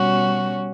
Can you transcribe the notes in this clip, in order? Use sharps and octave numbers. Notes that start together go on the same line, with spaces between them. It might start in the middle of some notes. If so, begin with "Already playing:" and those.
Already playing: B2 G3 C#4 F#4